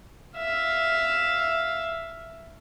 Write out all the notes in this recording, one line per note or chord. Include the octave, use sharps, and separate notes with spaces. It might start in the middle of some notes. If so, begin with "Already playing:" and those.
E5 F5